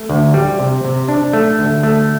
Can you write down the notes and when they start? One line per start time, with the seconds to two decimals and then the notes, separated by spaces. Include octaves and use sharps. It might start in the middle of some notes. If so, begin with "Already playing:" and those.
Already playing: A3
0.09 D2
0.34 G3
0.60 C3
0.85 C3
1.08 D4
1.33 A3
1.59 D2
1.83 A3